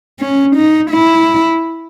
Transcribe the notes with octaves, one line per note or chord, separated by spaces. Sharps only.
C#4
D#4
E4